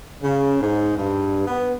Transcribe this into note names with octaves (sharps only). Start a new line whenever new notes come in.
C#3
G#2
G2
B3